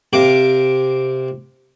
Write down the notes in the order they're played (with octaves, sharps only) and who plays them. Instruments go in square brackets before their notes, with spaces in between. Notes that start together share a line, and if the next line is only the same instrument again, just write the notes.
[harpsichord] C3 G4 A#4 F5 D6